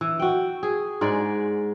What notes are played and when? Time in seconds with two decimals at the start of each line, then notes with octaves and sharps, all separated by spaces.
0.01 E3
0.19 F#4 G5
0.63 G#4
1.01 G#2 G#3 D5